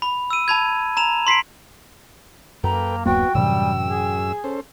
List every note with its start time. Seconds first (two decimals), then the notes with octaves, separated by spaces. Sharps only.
0.02 B5
0.30 E6 D#7
0.48 A5 B5 G#6
0.97 A#5 E7 F7
1.27 C6 B6 C7 D7
2.64 F#2 A#3 A4 B4 G5 A#5
3.06 D1 F#2 A#3 B3 F#4 G5
3.35 F#2 A2 C3 E3 G3 E6
3.87 G#4
4.44 C#4 A4 C5